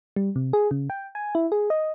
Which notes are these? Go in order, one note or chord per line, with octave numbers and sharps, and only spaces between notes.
G3
C3
G#4
C#3
G5
G#5
E4
G#4
D#5